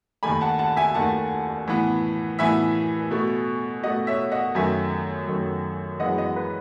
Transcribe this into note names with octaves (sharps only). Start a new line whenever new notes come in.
D#2 D#3 A3 G#5 B5
F#5 A5
F#5 A5
E5 G#5
D#2 D#3 A3 F#5 A5
A2 E3 B3
A2 E3 B3 E5 G#5
B2 A3
B2 A3 D#5 F#5
C#5 E5
D#5 F#5
F#2 D#3 A3 E5 G#5
F#2 D#3 A3
F#2 E3 G#3 B3 D#5 F#5
D#5 F#5
B4